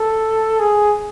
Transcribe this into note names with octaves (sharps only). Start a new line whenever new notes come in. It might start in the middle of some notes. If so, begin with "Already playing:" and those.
Already playing: A4
G#4